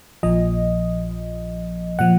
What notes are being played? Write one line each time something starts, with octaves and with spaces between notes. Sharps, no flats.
A#1 A#2 F3 D#5
A#2 F3 F#5